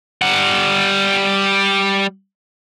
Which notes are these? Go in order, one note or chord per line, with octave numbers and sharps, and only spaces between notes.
G3 F#5